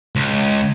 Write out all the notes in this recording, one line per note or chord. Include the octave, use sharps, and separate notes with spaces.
C#2